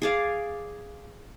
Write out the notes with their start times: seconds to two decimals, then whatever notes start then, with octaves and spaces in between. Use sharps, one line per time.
0.02 G#4 D5 F5